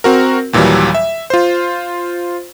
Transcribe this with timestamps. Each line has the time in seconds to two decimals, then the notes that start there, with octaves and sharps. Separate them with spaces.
0.04 C4 F#4 A#4
0.53 D#2 A#2 E3 F#3 G3
0.94 E5
1.30 F4 C5